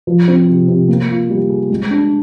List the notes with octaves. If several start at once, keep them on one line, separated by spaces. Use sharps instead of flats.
F3
C4
C3
C3
A#3
F4
G3
G#4
G#3
D4